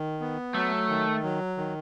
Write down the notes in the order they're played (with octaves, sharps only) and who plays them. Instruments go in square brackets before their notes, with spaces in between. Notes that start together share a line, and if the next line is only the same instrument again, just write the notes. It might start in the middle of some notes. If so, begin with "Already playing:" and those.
Already playing: [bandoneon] D#3
B3
[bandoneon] F#3 [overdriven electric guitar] A3
[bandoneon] D#3
F#3
D#3